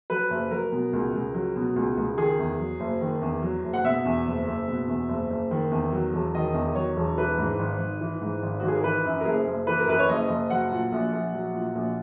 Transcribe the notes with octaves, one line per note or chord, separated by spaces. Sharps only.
F#3 B4
F#1
F#3 A#4
B2
C#2
C#2
F#3
B2
C#2
C#2
D#3 G#4
E2
F#3
F#1
D#3
E2
F#3
F#1
F#5
B2 E5
E2
F#1
F#1
B2
E2
F#1
F#1
D#3
E2
F#3
E1
D#3 D#5
E2
F#3 C#5
E1
E3 B4
G#2
G#1
G#1
E3
G#2
G#1
F#4
G#1
G#4
A#4
E3 B4
F#2
A#4
F#1 G#4
F#1
E3 B4
A#4
F#2 B4
C#5
F#1 D#5
F#1
F#3 F#5
A#2
A#1
A#1
F#3
A#2
A#1